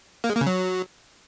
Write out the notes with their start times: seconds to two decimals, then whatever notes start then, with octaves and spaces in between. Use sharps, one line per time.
0.24 A#3
0.30 G#3
0.35 A#3
0.41 C#3
0.47 F#3